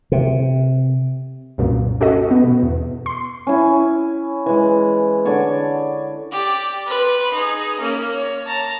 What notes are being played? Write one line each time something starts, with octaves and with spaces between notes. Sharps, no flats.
C3
C2 F#2 A#2
C#4 F#4 A4 D#5
B3
B2
E2
C6
C#4 E4
E3 G#3
D3 C#5 D5 C#6
G4 D5
B4 C6
D#4 G#4
A#3 C#4
C#5
A5 A#5